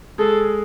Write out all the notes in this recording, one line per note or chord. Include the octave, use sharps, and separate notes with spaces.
G#3 G#4 A4